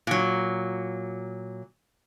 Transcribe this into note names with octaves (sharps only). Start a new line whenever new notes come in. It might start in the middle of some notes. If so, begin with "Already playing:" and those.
A#2 F#3